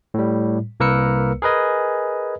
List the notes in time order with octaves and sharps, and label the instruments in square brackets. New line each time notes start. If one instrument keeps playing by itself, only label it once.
[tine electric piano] A2 G3
C2 A#3 A#4 B4 E6 C#7
G#4 A#4 B4 D#5 G#5